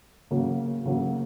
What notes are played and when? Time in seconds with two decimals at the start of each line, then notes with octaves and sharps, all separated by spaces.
0.31 C#3 F#3 A#3
0.86 C#3 F#3 A#3